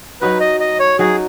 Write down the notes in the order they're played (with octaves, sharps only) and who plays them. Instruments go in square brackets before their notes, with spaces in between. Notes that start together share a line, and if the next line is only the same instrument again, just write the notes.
[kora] F#3 D#4 F#4 [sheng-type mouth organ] B4
[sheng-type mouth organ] D#5
D#5
C#5
[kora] F#3 D#4 F#4 [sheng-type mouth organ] G#4